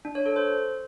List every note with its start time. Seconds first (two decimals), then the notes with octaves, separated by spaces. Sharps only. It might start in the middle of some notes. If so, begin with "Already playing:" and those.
0.05 D4
0.15 C#5
0.26 A4
0.36 C5